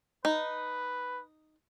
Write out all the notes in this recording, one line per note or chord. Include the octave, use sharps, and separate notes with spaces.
D#4 B4